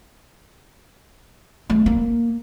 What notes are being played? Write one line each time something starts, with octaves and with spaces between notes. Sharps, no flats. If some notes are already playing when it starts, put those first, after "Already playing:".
A3
A#3